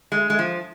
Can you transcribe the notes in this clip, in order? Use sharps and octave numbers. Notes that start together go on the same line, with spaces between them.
G#3
G#3
F3